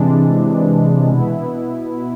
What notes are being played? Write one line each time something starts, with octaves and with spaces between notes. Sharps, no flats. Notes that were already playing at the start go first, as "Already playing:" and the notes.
Already playing: C3 E3 G#3 D4
B2 B3 E4